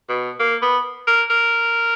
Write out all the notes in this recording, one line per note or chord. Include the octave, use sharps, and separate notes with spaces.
B2
A#3
B3
A#4
A#4